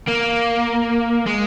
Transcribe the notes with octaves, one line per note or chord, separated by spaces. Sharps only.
A#3
G#3